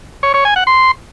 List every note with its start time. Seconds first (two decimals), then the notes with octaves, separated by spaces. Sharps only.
0.23 C#5
0.34 C#5
0.45 G#5
0.56 F#5
0.67 C6